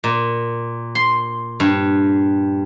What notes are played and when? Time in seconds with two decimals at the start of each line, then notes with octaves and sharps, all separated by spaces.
0.04 A#2
0.95 C6
1.60 G2